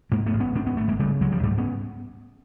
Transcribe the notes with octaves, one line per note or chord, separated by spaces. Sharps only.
G#2 G#3 A#3
A3 B3
A1
B3 C#4
G#2 C4 D4
B3 C#4
G#1 A3 B3
G#3 A#3
C#3 G3 A3
C#2 F#3 G#3
F3 G3
G#2 G3 A3
B3 C#4